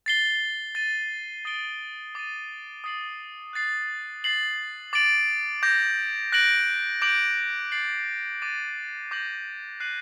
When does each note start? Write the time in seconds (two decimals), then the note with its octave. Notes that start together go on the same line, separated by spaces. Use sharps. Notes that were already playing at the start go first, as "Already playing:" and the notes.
0.06 A6 C7 G7
0.75 A6 D#7 G7
1.45 D#6 A6 D7 G7
2.15 D6 A6 D#7
2.84 D#6 A6 C7 F#7
3.53 F#6 A6 C7
4.24 A6 C7 F#7
4.93 D6 A6 D7 F#7
5.63 D6 G6 A#6
6.32 F#6 A#6 D7 F#7
7.02 D6 G6 D7 F#7
7.72 A6 C7 F#7
8.42 D6 A6 D#7
9.11 D6 G6 A#6 F#7
9.80 F#6 C7 D#7 F#7